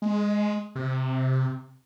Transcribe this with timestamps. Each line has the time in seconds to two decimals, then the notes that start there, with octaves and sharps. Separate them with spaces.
0.02 G#3
0.76 C3